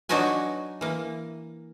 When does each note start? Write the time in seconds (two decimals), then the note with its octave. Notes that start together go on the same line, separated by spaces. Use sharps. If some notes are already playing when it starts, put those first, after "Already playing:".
0.09 F#3 D4 D#4 F#4 B4 G#5
0.81 E3 A#3